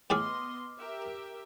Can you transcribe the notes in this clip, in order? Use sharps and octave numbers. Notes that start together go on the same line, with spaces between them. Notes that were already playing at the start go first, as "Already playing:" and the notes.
A2 G#3 B3 G#4 D#5 C6 D6 F6
G4 A#4 E5